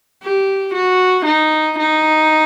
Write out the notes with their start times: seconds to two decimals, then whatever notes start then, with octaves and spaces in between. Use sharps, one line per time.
0.23 G4
0.74 F#4
1.26 D#4
1.79 D#4